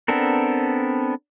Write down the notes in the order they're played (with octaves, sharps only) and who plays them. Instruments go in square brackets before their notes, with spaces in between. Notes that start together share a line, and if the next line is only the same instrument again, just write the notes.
[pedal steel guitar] B3 C4 D4 A4 A#4